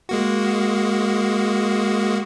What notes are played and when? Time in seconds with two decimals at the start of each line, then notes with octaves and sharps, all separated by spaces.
0.09 G#3 A#3 F#4